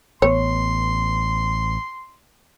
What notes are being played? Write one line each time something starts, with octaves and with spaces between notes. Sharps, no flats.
A1 B3 C#5 C6